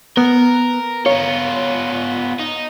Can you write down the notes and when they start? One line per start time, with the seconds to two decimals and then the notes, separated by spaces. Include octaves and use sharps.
0.17 B3 A#4
1.06 B3 F4 C#5
2.40 D#4